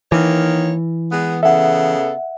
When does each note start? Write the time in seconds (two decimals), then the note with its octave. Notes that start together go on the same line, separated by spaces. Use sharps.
0.12 D#3 E3 A#3 C#5
1.11 G#3 B3
1.43 C#3 B3 A4 E5 F#5